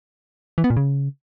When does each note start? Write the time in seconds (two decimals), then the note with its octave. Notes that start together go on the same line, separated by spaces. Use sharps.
0.58 E3
0.64 B3
0.70 A#2
0.77 C#3